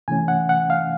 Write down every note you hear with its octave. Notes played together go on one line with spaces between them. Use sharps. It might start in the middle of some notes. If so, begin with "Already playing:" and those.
C3 E3 A3 C#4 G#5
F#5
F#5
F5